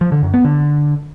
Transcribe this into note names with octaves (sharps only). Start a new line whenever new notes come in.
F3
D3
F#2
B3
D3